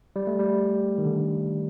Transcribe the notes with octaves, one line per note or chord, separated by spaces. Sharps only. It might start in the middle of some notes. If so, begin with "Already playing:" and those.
G3
A3
G3
D#3
D3